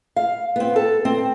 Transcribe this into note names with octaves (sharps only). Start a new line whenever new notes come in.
F5
B3 C4
A4
C4